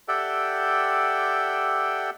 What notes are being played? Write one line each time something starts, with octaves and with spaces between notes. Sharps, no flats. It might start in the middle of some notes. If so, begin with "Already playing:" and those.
G4 A4 D5 E5 F#5 G5